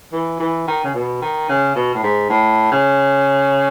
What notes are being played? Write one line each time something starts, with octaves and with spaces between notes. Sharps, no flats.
E3
E3
D#3
C#3
B2
D#3
C#3
B2
A2
G#2
A2
C#3